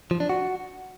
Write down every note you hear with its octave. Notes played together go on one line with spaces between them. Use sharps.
F3
D4
F#4